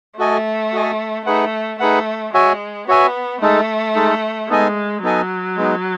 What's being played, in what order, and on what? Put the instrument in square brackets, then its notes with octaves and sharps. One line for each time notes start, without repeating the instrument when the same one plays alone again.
[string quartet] A3 [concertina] F#4 A4 D#5 G#5
[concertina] F#4 A4 D#5 G#5
[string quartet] A3 [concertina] D#4 G#4 B4 F#5
[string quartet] A3 [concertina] D#4 G#4 B4 F#5
[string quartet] G#3 [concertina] F#4 C#5 E5 G#5
[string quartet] B3 [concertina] F#4 C#5 E5 G#5
[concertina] G#3 D#4 A4 [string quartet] A3
[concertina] G#3 D#4 A4
[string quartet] G#3 [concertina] B3 D#4 A4 D#5 G#5
[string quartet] F#3 [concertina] B3 D#4 A4 D#5 G#5
[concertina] G#3 B3 D#4